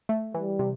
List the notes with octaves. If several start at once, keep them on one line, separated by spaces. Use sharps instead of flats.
A3
E3 G3
C3